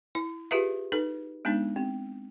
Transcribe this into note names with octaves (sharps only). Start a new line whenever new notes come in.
E4
F4 G4 G#4 B4 E5 F5
D#4 A4 B4
G#3 B3 D4 D#4
C4